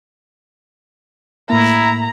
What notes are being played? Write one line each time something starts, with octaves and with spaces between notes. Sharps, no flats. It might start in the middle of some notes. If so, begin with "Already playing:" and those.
A2 A#3 E4 A#5